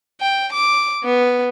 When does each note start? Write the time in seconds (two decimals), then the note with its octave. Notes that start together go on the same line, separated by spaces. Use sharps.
0.21 G5
0.53 D6
1.04 B3